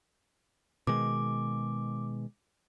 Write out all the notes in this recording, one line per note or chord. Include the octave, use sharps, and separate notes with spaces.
B2 D#3 G#3 D6